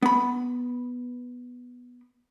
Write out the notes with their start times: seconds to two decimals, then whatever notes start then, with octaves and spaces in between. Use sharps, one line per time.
0.02 B3 B5